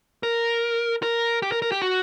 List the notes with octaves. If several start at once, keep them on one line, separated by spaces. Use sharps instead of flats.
A#4
A#4
G4
A#4
A#4
G4
F#4